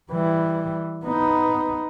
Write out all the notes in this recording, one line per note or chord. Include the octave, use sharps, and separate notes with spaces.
E3 G3
B3 D#4